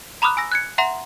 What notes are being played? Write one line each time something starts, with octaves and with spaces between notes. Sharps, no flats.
A#5 B5 D6 D#6 F6 F#6
G#5 E6 A#6
F#6 G#6 C#7
E5 F#5 A#5 C6